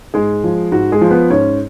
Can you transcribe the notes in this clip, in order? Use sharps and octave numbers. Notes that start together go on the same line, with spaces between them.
G#2 G#3 G#4
F3
G#2 F#4
G#3 G#4
F3
B3 B4
G#2 C#4 C#5